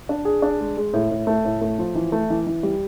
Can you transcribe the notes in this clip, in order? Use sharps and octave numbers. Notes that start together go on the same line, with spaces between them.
D4
G#4
D4
G#3
G#3
A2
A2
A3
A2
A3
F3
E3
A3
E3
E3
G3